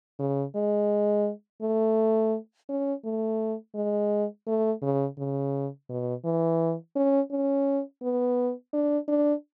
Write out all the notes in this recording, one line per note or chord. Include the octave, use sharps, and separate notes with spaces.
C#3
G#3
A3
C#4
A3
G#3
A3
C#3
C#3
B2
E3
C#4
C#4
B3
D4
D4